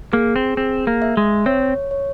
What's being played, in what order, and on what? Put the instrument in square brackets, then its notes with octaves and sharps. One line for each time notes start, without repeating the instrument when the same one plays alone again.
[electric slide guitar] A#3 [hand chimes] G#4
[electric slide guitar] C4
[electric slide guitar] C4 [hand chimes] G#4
[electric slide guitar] A#3
[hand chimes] E5
[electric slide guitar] G#3
[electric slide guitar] C4 [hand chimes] C#5
[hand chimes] C#5